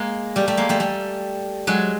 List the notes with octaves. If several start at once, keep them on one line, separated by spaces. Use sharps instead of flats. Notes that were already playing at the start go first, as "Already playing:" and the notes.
Already playing: G#3 A#3
G3 A3
G3 A3
G#3 A#3
G3 A3
G3 A3
F#3 G#3